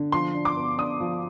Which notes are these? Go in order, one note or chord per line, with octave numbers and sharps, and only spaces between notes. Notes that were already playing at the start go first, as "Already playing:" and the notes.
Already playing: D3
F3 C6
D4
D6
B3
D4 D#6
F3